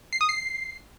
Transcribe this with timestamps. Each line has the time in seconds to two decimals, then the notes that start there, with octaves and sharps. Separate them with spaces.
0.13 C7
0.21 D#6
0.29 C7